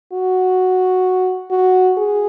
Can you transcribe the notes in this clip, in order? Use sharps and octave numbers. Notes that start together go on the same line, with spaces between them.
F#4
F#4
G#4